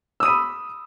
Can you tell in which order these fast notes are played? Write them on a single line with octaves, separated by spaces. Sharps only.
E6 D#6 D#7 B5